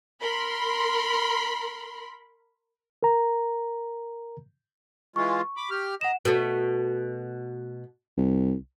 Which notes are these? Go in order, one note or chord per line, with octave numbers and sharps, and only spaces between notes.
A#4 B5 C6
A#4 A#5
E3 G#3 F4 C#6
B5 D6
G4 F6
D#5 F#5 A#5 E7
B2 A3
C2